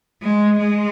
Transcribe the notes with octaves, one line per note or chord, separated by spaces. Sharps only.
G#3
G#3